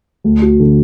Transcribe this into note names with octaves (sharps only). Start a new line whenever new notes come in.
D2
F#4
D3